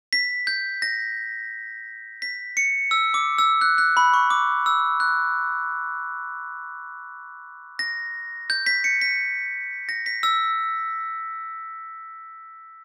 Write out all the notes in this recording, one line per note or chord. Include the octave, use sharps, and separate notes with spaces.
B6
G6
A#6
B6
C#7
E6
D6
E6
F#6
F#6
B5
C#6
D6
E6
F#6
A#6
G6
B6
C#7
B6
A#6
B6
E6